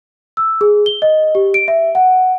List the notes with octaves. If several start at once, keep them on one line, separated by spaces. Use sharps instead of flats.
E6
G#4
G7
D#5
G4
D7
E5
F#5